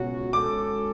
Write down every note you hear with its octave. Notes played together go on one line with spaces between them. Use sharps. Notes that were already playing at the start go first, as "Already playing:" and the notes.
Already playing: C#2 B2 F#3 C#4 F#4
G#2 G#3 C#4 F#4 A4 D6